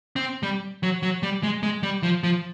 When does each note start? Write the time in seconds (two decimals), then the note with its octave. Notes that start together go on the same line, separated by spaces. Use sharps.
0.16 C4
0.43 G3
0.83 F#3
1.03 F#3
1.23 G3
1.43 G#3
1.63 G#3
1.83 G3
2.03 F3
2.23 F3